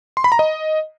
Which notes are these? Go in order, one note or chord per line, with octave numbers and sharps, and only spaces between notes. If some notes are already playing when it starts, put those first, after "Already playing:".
C6
B5
A#5
D#5